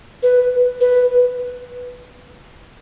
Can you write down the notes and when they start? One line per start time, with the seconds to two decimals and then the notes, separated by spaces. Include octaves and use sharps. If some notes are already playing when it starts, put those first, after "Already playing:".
0.23 B4
0.81 B4